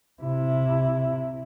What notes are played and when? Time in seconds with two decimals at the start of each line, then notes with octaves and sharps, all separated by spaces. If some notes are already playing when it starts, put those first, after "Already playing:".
0.23 C3 E4